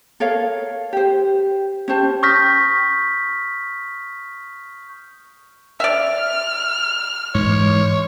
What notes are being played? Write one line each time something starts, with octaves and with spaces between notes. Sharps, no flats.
A4 A#4 C#5 F5
G4 C5
C#4 G4 C5 A5
C#6 D#6 F6 G6 A#6 B6
D5 E5 F6
G#2 E3 C#5